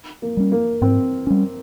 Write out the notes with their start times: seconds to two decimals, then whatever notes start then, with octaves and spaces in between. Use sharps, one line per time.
0.22 A#3
0.37 G3 C#4
0.52 A#3
0.81 G#2 C4
1.27 G3 C#4